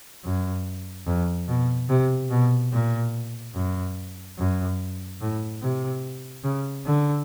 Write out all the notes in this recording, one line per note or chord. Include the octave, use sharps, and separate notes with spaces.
F#2
F2
B2
C3
B2
A#2
F#2
F#2
A2
C3
C#3
D3